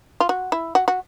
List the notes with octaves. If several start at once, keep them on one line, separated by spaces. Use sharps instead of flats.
F4
F#4
E4
F#4
F#4